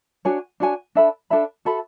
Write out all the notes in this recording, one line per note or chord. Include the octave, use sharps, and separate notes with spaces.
D4 F#4 C#5 G#5
D4 F#4 C#5 G#5
D4 A4 E5 B5
D4 A4 E5 B5
F#4 A4 E5 B5